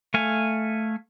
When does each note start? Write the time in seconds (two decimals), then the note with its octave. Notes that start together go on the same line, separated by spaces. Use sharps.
0.14 A3 F5 G#5